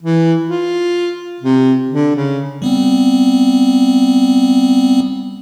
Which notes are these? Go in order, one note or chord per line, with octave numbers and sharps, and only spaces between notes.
E3
F4
C3
D3
C#3
G3 B3 C4